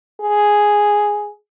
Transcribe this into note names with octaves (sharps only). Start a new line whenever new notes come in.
G#4